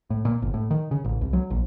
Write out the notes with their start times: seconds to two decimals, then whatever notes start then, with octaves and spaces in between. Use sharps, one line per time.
0.10 A2
0.25 A#2
0.42 G1
0.54 A2
0.71 D#3
0.91 C#3
1.05 A1
1.21 C2
1.33 F#3
1.50 A#1